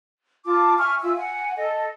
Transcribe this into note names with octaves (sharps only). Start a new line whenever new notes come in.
F4 A5 D6
E5 G#5 C#6 F6
F4 E5 G#5 E6
F#5 G#5
A4 D#5